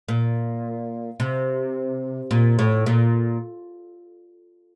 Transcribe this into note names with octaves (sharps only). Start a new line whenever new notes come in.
A#2
C3
A#2
A2
A#2